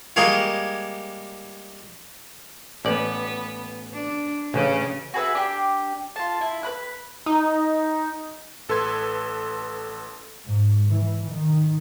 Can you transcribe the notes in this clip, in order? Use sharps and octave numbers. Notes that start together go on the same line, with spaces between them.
G3 G#3 A#3 G#4 C#5 F5
A1 B3 D5
D4
A1 C#3 C#4
F#4 G#4 B4 E5
D4 G4
F4 A5
E4
B4 B5 F#6
D#4
A1 A4 B4 C6 G#6
G#2
E3
D#3